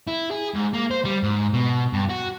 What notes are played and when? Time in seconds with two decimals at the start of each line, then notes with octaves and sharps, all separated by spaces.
0.08 E4
0.31 G#4
0.54 G#2
0.73 A#3
0.91 C5
1.05 G3
1.23 G#2
1.53 B2
1.93 G2
2.09 F#4